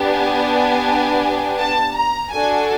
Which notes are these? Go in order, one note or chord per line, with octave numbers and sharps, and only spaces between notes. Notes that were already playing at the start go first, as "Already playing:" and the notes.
Already playing: B3 D4 G4
G#5
A5
A#5
D4 F#4 A4 G#5